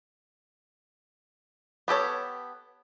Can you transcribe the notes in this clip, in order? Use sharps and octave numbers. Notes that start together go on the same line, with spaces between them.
B3 G4 A4 C#5